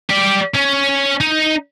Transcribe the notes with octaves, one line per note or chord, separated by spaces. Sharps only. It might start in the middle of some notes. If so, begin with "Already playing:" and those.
G4 D5
C#4
D#4